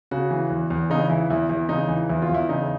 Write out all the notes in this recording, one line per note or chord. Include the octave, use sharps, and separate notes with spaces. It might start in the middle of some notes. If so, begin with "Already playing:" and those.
C#3 F#4
E3
E2
E2
C#3 D#4
E3 E4
E2 E4
E2 E4
C#3 D#4
E3
E2 E4
F4
E2 E4
C#3 D#4